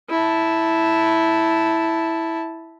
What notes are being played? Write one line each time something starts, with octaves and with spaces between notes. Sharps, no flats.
E4 A5